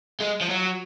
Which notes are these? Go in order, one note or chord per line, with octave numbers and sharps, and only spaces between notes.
G#3
F3
F#3